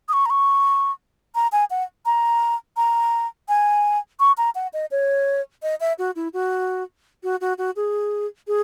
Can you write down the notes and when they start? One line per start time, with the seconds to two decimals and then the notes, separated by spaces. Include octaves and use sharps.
0.09 D#6
0.13 C#6
0.26 A#5
0.30 C#6
1.35 A#5
1.52 G#5
1.70 F#5
2.06 A#5
2.77 A#5
3.48 G#5
4.20 C#6
4.37 A#5
4.55 F#5
4.73 D#5
4.91 C#5
5.62 D#5
5.80 E5
5.98 F#4
6.16 E4
6.33 F#4
7.23 F#4
7.41 F#4
7.58 F#4
7.76 G#4
8.47 G#4